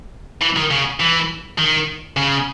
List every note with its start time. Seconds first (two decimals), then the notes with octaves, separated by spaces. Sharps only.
0.41 E3
0.56 D#3
0.71 C#3
1.00 E3
1.58 D#3
2.17 C#3